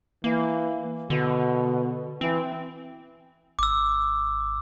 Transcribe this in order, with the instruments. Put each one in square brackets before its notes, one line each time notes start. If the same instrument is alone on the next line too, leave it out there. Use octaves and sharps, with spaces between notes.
[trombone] E3 [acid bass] A#3
[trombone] B2 [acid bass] D3
[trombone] E3 [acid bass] C4
[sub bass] G#1 [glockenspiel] D6 E6